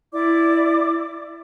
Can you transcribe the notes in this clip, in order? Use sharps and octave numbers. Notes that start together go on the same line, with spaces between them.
E4 D5 D6